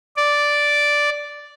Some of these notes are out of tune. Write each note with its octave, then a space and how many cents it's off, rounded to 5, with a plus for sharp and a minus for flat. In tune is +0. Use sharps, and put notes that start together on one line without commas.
D5 -5